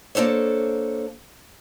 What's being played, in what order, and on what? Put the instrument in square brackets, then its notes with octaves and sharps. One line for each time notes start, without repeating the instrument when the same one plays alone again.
[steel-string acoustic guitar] A#3 D4 A4 C5 C#5